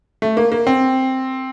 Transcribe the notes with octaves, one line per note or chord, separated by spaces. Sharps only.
A3
A#3
A#3
C4